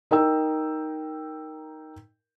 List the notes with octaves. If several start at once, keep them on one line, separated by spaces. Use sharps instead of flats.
D#4 A#4 G5 E6